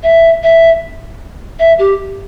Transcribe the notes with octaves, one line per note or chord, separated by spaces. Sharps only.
E5
E5
E5
G4